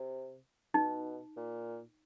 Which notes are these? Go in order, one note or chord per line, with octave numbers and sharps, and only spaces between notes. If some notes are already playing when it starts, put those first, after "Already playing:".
Already playing: C3
B2 D#4
A#2